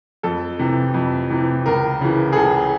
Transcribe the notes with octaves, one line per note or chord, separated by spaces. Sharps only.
F2 A4
C3 E3
F2
C3 E3
C#2 A#4
C#3 E3
G#4
C#2 A4